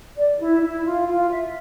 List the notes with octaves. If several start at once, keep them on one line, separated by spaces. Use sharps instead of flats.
D5
E4
E4
F4
F4
E5